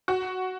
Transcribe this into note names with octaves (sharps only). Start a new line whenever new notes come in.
F#4